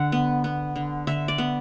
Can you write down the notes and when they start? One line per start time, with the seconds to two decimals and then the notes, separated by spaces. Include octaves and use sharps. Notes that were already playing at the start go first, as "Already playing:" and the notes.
Already playing: D3 F#5
0.12 B3
0.44 B3
0.76 D3
1.07 D3 E5
1.28 D5
1.38 B3